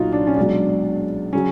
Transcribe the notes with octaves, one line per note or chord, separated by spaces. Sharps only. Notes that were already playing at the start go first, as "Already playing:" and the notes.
Already playing: B1 A#2 F#3 D#4 F4 F#4
D4
C#4
C#2 B2 F#3 D4
C#3 F#3 C#4